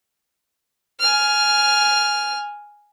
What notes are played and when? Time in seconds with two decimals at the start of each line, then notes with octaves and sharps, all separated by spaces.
1.00 G#5 F6